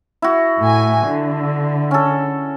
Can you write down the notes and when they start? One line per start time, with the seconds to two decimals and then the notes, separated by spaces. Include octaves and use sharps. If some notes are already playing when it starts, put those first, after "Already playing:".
0.22 E4 F#4
0.59 A2 G#5
1.07 D3
1.91 C#4 A4